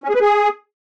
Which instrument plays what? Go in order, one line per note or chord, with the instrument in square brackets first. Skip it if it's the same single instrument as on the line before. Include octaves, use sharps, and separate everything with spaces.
[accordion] C#4
G#4
B4
G#4